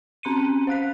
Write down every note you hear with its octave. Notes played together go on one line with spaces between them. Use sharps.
C4 C#4 C6 C#7 D#7
C5 F5 F#6 B6